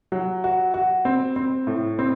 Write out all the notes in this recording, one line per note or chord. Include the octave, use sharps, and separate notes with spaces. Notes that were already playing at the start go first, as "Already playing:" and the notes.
F#3
F#4
F#4
C4
C4
A2
C4